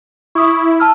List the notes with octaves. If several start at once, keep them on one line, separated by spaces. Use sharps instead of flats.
E4 C#6 D#6
A5 E6 F6